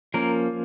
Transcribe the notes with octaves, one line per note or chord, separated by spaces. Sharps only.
F3 A#3 C#4 A#4